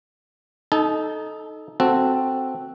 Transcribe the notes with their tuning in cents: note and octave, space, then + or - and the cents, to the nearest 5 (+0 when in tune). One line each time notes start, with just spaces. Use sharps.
D#4 +0 A4 -15 A5 -45
C4 +0 F#4 +0 A4 +0